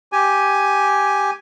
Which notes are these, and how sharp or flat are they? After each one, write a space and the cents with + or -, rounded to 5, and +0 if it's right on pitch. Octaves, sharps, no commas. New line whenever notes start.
G4 +0 G#5 +0